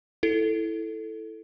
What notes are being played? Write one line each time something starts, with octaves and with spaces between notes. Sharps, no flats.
E4 A4